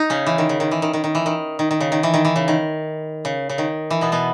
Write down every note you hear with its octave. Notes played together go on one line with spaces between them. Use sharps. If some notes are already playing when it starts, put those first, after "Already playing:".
Already playing: D#4
C#3 C#4
E3
D#3
C#3
D#3
E3
D#3
D#3
D#3
E3
D#3
D#3
D#3
C#3
D#3
E3
D#3
E3
C#3
D#3
C#3
C#3
D#3
E3
B2 B3
B2 B3